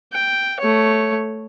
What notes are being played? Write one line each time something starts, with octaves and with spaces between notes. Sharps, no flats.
G5
A3 C#5